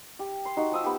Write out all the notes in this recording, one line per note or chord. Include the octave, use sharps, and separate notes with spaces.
G4
C6
D#4 F#4 G4
F3 D#6 E6
B3 G4